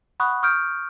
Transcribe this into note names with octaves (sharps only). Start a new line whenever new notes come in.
F#5 B5 C#6 D#6 F#6
C#6 D#6 F6 G6 D7